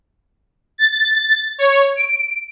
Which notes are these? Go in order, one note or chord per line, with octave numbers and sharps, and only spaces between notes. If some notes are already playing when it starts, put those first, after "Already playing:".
A6
C#5
D7